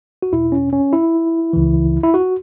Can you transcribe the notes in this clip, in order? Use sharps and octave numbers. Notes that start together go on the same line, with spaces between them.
F#4
E2 B2 E4
C#4
C#4
E4
C#2 C#3 E3
E4
F#4